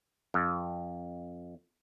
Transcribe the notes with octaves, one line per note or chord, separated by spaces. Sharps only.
F2